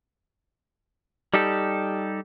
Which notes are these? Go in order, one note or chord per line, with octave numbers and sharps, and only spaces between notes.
G3 D#4 G4 A4